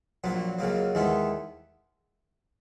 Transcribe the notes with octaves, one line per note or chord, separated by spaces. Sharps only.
A#1 A#2 F#3 A#3
C#2 C#3 F#3 A#3
D#2 D#3 G#3 B3 E4